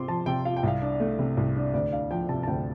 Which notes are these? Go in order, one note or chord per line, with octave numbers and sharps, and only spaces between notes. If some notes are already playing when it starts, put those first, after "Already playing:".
Already playing: C3 C4 F4 C6 D6
F3 A5
C3 G5
F4 F5
G5
C2 F5
D4
A3
C3
C2
D4
D2 D5
D4 F5
F3 G5
C3 A5
A5
D2 G5